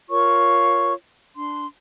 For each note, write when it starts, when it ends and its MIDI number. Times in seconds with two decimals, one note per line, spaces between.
0.09 0.93 65
0.09 0.93 70
0.09 0.93 73
0.09 0.93 85
1.36 1.65 62
1.36 1.65 84